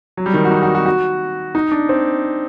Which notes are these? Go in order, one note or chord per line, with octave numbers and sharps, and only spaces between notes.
F#3
G3
D#3
F#4
D#4
F#4
F#4
F#4
D#4
D4
C4